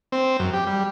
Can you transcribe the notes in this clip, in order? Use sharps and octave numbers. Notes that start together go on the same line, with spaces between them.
C4
F#2
G4
G3